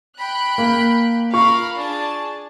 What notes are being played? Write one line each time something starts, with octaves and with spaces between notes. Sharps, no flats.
G5 B5 F#6
A#3
F4 A#4 F5 B5 C#6
D4 G#4 A5